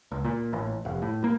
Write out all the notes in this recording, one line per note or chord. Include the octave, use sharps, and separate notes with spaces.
C#2
A#2
A1
F1
A2
A#3